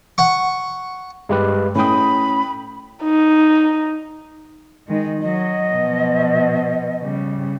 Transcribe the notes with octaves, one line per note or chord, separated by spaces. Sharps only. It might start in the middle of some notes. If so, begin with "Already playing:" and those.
F#5 C#6
G2 G#3 G4 B4
A2 C#4 G5 B5 D#6
D#4
D#3 G#3
F#3 D#5
B2 F3
C#3 G3